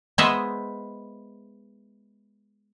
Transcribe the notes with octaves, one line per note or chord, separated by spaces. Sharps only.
G#3 B3 C5 C#5 D#5 E5